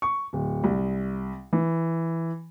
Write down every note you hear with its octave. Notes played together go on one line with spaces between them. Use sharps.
C#6
D1
C2
E3